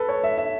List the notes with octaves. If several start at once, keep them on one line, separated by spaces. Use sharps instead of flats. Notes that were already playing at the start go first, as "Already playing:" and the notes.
Already playing: A4 B4
C#5
E5
E5